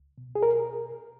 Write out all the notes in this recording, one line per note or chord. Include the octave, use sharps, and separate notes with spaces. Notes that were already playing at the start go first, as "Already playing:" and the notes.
Already playing: C#2
B2
G#4
A#4